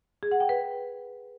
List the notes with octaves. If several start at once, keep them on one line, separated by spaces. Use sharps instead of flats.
G#4
F#5
G5
B4